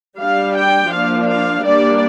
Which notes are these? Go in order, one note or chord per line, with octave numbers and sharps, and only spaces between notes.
G3 D4 F5
G5
F3 A#3 D4 F5
F5
G3 A#3 D4 D5